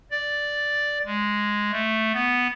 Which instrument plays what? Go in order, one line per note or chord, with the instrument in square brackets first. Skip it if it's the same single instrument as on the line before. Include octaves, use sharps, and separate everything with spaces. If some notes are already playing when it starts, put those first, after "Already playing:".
[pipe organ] D5
G#3
A3
B3